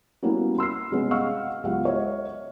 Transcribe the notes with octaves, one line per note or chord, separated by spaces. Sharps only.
G3 A#3 B3 C#4 E4 F#4
C6 E6 F6 C7
C3 G3 G#3 B3 C#4
D#5 F5 F#5 C#6 E6 F6
C#2 F#3 B3 G4 F5 F#5
C#5 D#5 E5